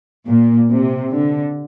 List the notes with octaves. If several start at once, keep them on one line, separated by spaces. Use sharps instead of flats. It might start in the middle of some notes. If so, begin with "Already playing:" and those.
A#2
C3
D3